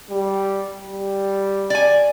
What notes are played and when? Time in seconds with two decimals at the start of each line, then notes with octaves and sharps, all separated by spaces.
0.10 G3
0.87 G3
1.70 D5 G#5